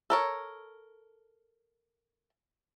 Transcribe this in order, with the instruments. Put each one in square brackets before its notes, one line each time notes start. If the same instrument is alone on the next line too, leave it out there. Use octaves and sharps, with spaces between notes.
[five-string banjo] A4 A#4 C#5